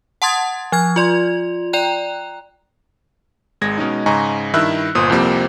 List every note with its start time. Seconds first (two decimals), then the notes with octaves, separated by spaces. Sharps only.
0.22 F#5 A5 C6 D#6 G#6 A6
0.72 F3 F6 G#6
0.96 F4 D5 C6
1.73 D5 G5 A#5 F#6
3.61 G#1 G#3 G#6 A#6
3.78 B2 G#3 C#4 D#4
4.06 G#2 C#3 D#5 G#5 A#5 C#6
4.54 G2 D#3 E4 E5 E6 F#6
4.95 G1 A#2 C5 C6 D#6
5.10 C2 F2 F3 A#3 C4 G4